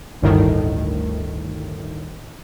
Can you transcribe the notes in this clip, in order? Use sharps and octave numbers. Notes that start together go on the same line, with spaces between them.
G1 D2 A2 D#3